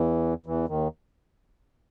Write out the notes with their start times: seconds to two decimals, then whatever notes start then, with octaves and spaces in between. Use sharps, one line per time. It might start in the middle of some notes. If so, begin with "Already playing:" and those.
Already playing: E2 E3
0.46 E2 E3
0.68 D#2 D#3